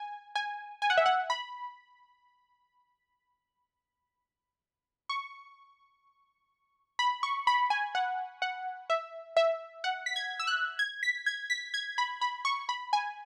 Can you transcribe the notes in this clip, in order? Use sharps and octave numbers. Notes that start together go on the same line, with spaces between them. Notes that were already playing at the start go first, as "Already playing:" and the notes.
Already playing: G#5
G#5
G#5
F#5
E5
F#5
B5
C#6
B5
C#6
B5
G#5
F#5
F#5
E5
E5
F#5
B6
G#6
E6
F#6
G#6
B6
G#6
B6
G#6
B5
B5
C#6
B5
G#5